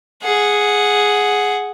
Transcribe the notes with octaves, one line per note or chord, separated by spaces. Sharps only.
G#4 F#5